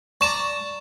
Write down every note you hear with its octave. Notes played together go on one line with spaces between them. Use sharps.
D5 A5 A#5 C#6 E7